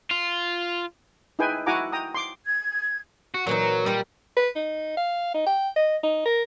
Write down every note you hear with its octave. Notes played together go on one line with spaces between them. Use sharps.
F4
D#4 E4 G#4 B4 G5 G#5
E4 F#4 F#5 G#5 A#5 D6
G5 A#5 D#6
C6 D6
G#6
F#4
A#2 E3 F#3 D#4
G3 F4 D#5 F#5
B4
D#4
F5
D#4
G5
D#5
D#4
A#4